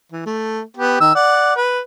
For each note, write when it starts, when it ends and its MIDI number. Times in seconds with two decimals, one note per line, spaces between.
0.12 0.24 52
0.26 0.61 57
0.77 0.99 59
0.77 0.99 67
1.00 1.12 51
1.00 1.12 88
1.15 1.54 74
1.15 1.54 78
1.56 1.80 71